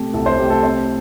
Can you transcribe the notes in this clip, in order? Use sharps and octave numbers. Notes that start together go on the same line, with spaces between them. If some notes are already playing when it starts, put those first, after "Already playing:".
Already playing: C3 A3 G4
C2 A4
C5
A3 G4
A4
C3 C5